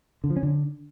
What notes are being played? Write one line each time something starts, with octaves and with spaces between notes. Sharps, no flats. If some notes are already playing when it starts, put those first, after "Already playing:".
D3
F3
C#4
D3